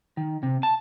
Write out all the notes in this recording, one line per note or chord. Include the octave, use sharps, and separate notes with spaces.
D#3
C3
A5